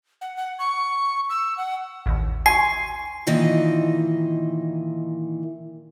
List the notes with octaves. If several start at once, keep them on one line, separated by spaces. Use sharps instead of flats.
F#5
F#5
C#6
E6
F#5
A1 D#2
G#5 C6 C#6 C7
A#2 D#3 E3 D#4 D#5